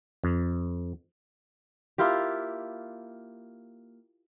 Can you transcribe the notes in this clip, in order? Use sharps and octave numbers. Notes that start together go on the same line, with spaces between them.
F2
A#3 E4 F4 G4